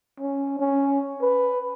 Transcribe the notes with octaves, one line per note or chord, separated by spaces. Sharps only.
C#4
C#4
B4